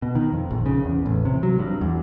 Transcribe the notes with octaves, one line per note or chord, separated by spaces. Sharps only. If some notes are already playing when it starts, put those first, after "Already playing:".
B2
D#3
F2
A#1
C#3
E2
A1
C3
F#3
G2
E2